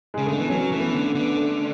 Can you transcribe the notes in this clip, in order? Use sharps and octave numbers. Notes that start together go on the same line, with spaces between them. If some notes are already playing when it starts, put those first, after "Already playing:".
C#3 G#3
D3 A3
E3 B3
F#3 C#4
E3 A3
B3
D3
B3
D3
A3